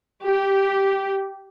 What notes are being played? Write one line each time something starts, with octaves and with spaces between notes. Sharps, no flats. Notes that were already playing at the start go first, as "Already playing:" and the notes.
G4